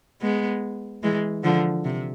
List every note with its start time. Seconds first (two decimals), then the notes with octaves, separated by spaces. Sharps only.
0.22 G#3 B3
1.03 E3 G#3
1.44 D3 F3
1.85 C3